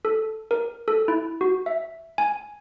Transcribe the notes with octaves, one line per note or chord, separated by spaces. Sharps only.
A4
A#4
A4
E4
F#4
E5
G#5